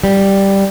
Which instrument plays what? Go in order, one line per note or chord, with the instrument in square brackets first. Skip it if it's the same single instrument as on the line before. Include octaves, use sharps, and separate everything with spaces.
[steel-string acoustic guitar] G3